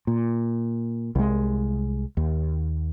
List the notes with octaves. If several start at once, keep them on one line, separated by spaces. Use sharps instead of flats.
A#2
C2 G#3
D#2